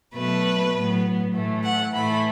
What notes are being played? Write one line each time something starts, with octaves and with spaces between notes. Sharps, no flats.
B2 F#3 A3 B4
A2 F#3 B3
A2 E3 A3
F#5
A2 E3 A3 B5